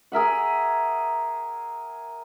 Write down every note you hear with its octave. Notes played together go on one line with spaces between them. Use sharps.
G#4 A#4 E5 F#5